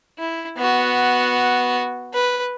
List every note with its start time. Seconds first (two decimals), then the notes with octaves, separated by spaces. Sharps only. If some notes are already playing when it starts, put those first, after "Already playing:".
0.19 E4
0.57 B3 F#4
2.14 B4